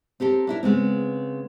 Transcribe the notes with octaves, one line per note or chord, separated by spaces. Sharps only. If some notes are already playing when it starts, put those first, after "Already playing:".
C4 G4 A4 A#4
D4 E4 A#4
C#3 G#3 B3 C4